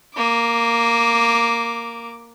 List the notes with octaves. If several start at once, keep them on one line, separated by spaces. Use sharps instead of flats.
A#3 D6